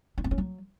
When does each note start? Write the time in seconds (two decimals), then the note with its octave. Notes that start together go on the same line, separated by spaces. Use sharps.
0.18 D4
0.24 C4
0.31 C#4
0.38 F#3